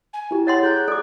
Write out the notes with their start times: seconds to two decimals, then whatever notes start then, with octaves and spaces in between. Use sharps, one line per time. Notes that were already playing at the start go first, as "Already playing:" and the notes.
0.13 G#5
0.31 E4 G4
0.47 C#5 F#5 C6 A6
0.63 G#4 A#5 F#6 G6
0.88 A4 D5 D6